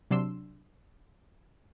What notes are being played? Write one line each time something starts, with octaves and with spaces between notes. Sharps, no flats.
C3 F#3 D4 C6 E6